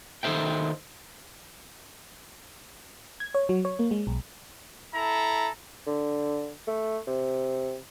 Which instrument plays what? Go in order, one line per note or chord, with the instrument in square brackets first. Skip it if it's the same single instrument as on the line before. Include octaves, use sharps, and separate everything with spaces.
[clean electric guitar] D#3 A4 C5 E5 G5
[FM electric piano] G#6
C#5
F#3
C#5
A#3
G#3
B1
[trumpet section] E4 A4 A#5
[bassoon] D3
A3
C3